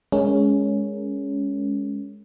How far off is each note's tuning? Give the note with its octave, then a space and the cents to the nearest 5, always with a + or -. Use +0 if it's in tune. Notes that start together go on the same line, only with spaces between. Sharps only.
G#3 +0 C#4 +10 A#4 +0